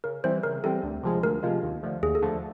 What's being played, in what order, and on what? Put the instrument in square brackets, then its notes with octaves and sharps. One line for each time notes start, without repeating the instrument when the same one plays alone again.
[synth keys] C#3 [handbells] A#4
[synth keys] E3 G3 C4 [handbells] C5
[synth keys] C#3 [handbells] A#4
[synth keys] E3 G3 C4 [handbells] A4
[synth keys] D2
C3 F3 G#3
[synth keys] D2 [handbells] A#4
[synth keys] C3 F3 G#3
D#2
D3 F3 A3
[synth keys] D#2 [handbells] G#4
[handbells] A4
[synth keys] D3 F3 A3